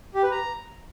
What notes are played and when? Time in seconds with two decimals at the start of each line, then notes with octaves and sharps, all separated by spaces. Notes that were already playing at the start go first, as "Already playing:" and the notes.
0.14 G4
0.23 B4
0.31 A#5